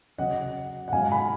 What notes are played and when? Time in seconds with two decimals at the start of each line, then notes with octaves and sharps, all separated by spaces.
0.18 C#3 F#3 C#4 D#5 F#5
0.88 F#5
0.92 G#2 F#3 C#4 F5 G#5
1.11 G#5 B5